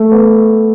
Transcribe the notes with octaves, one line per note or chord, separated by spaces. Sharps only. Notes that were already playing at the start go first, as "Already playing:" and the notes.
Already playing: A3
B3